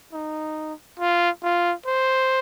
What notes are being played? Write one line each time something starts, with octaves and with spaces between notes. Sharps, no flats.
D#4
F4
F4
C5